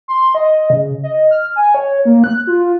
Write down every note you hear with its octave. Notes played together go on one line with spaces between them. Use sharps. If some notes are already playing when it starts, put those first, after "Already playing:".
C6
D#5
C#3
D#5
F6
G#5
C#5
A#3
F#6
F4